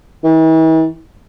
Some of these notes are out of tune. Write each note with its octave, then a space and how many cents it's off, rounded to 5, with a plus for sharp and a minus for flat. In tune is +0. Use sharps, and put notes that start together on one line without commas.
E3 -45